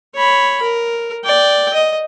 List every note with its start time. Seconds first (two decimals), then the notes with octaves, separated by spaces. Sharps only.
0.15 C#5 B5
0.62 A#4
1.25 D5 G5
1.74 D#5